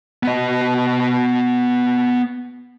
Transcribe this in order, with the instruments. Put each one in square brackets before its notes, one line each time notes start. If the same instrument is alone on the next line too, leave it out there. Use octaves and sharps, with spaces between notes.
[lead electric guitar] B3 D#5